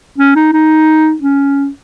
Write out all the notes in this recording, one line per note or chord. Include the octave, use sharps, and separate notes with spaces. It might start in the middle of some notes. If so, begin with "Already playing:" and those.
C#4
D#4
D#4
C#4